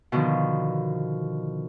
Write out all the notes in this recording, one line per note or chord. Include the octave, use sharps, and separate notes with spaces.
B2 D3 D#3 F3